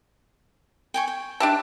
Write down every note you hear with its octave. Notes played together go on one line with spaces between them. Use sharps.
G5 G#5 C#6
G5
D4 G4 E5 A5